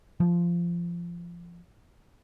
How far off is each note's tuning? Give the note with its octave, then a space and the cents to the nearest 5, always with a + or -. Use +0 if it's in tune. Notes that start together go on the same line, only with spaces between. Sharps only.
F3 -20